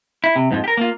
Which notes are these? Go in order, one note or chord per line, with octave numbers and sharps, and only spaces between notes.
E4
C3
F2 G#2 F3
G4 A#4
A#3 F4